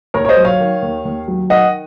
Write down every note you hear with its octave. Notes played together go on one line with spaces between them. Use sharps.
D#2 A#4 C#5
C#5
C5 D#5
F#3
C#5 F5
D#3
D#2
D#2
F#3
D#3 D#5 F#5